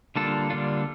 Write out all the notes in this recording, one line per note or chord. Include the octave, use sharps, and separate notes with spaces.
D3 G3 A#3 D4 F4 A4
D3 G3 A#3 D4 F4